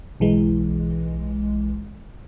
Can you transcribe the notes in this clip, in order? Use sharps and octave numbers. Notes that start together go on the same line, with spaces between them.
B1 E3 G#3